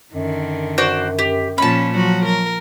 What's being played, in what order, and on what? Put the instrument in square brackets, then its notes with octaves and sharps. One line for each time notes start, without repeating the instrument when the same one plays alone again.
[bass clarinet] F#2 [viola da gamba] D3 D#3
[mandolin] F#4 C5 D5
G4
[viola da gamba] A#2 F3 C#4 [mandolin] A5 B5
[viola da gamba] F3 F#4 [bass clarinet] F#3
[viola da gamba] A#4